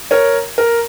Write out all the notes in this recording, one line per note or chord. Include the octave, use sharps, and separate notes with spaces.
A#4 C#5
A#4